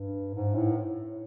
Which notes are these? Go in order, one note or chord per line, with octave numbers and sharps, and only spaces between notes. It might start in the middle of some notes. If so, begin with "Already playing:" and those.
Already playing: G2
G#2
A2